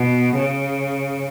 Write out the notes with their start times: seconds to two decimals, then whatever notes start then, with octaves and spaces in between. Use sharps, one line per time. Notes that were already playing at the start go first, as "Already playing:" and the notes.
Already playing: B2
0.38 C#3